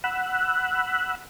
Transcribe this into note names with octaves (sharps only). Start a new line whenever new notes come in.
F#5 B5 E6 F#6